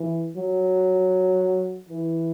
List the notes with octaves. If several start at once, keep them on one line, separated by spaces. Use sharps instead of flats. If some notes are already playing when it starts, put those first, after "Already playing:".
Already playing: E3
F#3
E3